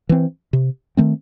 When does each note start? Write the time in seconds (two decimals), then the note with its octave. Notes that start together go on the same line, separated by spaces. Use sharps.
0.09 E3 C4
0.53 C3
0.97 D#3 A3 C4